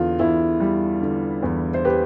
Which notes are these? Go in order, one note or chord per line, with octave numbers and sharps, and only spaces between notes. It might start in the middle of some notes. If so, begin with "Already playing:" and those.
Already playing: E2 D3 F4
E2 E4
G3
D3
E2
C5
G4 B4